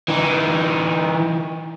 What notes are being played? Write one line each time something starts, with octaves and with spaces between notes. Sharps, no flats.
E3 D#4